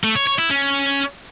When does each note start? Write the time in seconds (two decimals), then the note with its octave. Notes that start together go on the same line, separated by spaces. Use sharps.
0.04 A3
0.15 C#5
0.27 C#5
0.39 E4
0.50 C#4